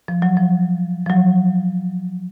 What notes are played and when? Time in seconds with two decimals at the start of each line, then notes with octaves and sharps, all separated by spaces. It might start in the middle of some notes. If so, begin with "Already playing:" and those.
0.08 F3
0.22 F#3
0.37 F3
1.06 F3
1.10 F#3